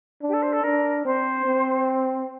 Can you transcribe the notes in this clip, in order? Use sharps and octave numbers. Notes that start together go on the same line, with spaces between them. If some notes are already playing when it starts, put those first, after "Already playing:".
D4
G4
A4
C5
A4
D4 A#4
C4 C5
C4